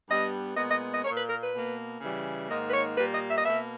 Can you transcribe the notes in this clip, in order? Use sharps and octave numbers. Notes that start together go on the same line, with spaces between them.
G2 G3 B3 D#5
A#2 G#3 B3 D#5
D#5
D#5
A#2 A#3 C#5
B4
A#4
B4
B2 A#3
C#3 E3 G3
G#2 D#3 A#3 D#5
B4
C#5
A#2 G3 A#3 B4
D#5
E5
D#5
B2 A#3 E5